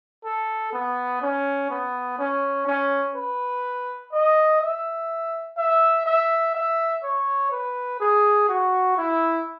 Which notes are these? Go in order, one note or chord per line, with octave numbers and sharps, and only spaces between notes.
A4
B3
C#4
B3
C#4
C#4
B4
D#5
E5
E5
E5
E5
C#5
B4
G#4
F#4
E4